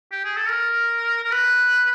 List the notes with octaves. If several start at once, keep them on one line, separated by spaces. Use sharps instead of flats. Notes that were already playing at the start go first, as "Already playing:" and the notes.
G4
G#4
A4
A#4
A#4
B4